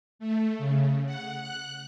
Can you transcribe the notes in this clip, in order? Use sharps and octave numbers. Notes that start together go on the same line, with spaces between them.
A3
C#3
F#5
F#6